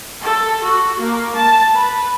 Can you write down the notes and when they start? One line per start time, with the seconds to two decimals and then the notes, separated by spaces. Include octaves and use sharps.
0.21 A4
0.63 F#4
1.00 A#3
1.35 A5
1.74 B4